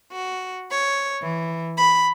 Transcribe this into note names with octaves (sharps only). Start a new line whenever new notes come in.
F#4
C#5
E3
B5